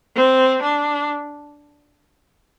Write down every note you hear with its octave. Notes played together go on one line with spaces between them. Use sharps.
C4
D4